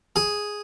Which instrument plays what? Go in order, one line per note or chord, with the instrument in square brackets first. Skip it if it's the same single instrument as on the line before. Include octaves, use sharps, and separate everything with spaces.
[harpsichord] G#4